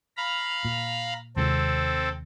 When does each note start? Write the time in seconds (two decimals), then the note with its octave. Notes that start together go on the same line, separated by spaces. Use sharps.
0.17 F5 A#5 B5
0.65 A#2
1.36 D#2 C3 G#3 C4 A4